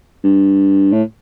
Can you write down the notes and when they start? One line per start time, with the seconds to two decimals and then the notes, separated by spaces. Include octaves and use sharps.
0.24 G2
0.93 A2